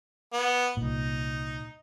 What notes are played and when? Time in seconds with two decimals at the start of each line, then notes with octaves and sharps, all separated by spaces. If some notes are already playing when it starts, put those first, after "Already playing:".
0.33 B3
0.77 C2 A#2 D#4